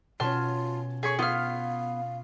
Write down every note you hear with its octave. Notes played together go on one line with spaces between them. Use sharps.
B2 C#4 F4 A5 C6 F6
G#4 C#5 C#6 G#6 B6
B3 F4 F5 F6